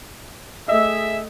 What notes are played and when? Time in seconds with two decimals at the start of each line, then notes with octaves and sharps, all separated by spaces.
0.68 A3 G#4 D#5 E5